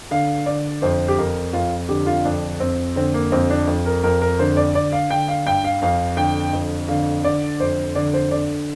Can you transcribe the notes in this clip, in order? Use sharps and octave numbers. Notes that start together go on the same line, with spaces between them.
D3 F5
D3 D5
F2 C5
G4
F2 A#4
F2 F4
D3 G4
F4
F2 D4
F2 C4
D3 C4
A#3
F2 C4
D4
F2
A#4
F2 A#4
A#4
D3 C5
D5
D3 D5
F5
D3 G5
F5
G2 G5
F5
F2 F5
D3 G5
F2
D3 F5
D3 D5
F2 C5
D3 D5
C5
D3 D5